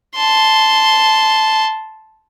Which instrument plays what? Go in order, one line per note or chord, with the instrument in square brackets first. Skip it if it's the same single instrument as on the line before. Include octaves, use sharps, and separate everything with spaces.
[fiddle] A5 C6